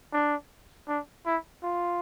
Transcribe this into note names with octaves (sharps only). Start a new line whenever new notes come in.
D4
D4
E4
F4